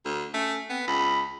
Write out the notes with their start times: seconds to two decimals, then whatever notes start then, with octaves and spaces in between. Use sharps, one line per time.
0.06 D2
0.34 A3 C#4
0.70 B3 C4
0.87 C#2 B5